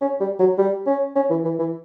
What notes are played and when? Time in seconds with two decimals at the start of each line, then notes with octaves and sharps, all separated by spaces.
0.01 C#4
0.20 G3
0.40 F#3
0.58 G3
0.87 C#4
1.16 C#4
1.30 E3
1.45 E3
1.59 E3